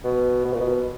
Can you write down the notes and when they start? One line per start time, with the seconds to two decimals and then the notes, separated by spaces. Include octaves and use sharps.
0.04 B2
0.45 B2
0.53 A#2
0.61 B2